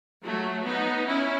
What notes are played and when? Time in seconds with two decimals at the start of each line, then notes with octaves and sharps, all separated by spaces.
0.25 F#3 A3
0.66 B3 D#4
1.08 C#4 E4